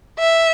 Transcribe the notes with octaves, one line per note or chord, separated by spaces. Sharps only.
E5